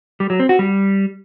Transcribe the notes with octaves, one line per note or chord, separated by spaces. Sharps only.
G3
F#3
C4
F#4
G3